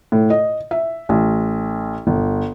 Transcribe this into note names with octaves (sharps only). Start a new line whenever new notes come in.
A2
D#5
E5
A1
G1